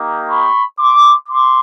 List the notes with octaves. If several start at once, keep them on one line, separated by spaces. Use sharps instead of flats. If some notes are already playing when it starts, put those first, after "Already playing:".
Already playing: A#3 D#4 G4
B5 C#6
C6 D6
C6 D6